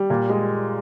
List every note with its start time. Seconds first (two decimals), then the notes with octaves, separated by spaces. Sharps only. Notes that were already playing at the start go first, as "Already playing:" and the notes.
Already playing: G3
0.10 A#2
0.30 G#3